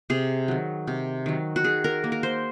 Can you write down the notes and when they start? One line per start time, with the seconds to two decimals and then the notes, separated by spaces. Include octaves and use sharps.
0.10 C3 G#4
0.48 D#3 F#3
0.87 C3
1.26 D#3 F#3
1.56 F#4
1.64 D#3 G#4
1.84 A#4
2.04 A#3
2.12 A#4
2.23 C5